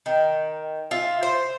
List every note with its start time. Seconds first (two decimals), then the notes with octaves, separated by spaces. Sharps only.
0.06 D#3
0.91 F4 E5
1.23 C5